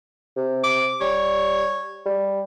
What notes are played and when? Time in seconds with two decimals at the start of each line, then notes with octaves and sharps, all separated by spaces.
0.37 C3
0.64 D6
1.01 G3 C#5
2.06 G3